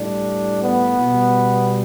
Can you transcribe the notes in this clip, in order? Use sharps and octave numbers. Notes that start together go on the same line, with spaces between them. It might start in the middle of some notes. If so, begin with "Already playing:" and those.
Already playing: A2 G3 D4
B3
B2 G3